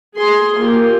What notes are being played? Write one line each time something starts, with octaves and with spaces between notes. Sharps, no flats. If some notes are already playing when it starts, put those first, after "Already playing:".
G#4 C6
A#3 F4 G4